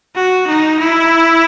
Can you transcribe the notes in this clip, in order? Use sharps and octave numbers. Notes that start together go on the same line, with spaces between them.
F#4
D#4
E4